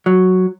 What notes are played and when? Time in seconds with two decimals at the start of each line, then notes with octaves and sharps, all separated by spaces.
0.06 F#3